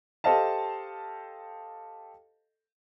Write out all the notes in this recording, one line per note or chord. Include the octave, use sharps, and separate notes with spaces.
G4 A4 C5 D#5 F5 A5